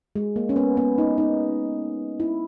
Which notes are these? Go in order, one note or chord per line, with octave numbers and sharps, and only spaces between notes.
G#3
A#3
C#4
B3
B3
D#4
D#4
E4